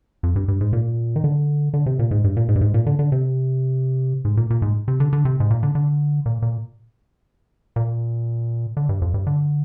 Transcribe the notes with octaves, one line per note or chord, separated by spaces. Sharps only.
F2
G2
G2
G#2
A#2
D#3
D3
D3
C3
A#2
G#2
G2
A#2
G#2
G2
G#2
A#2
D3
D3
C3
G#2
A#2
A#2
G#2
C3
D3
D3
C3
G#2
A#2
D3
D3
A#2
A#2
A#2
D3
G2
F2
G2
D3